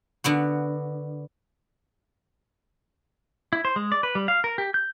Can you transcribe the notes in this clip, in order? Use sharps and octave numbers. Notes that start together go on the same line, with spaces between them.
D3 B3 F#4
E4
C5
G#3
D5
B4
G3
F5
A#4
G4
G6